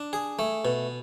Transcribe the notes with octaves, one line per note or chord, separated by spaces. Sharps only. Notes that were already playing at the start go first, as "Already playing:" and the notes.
Already playing: D4
G#4
A3
B2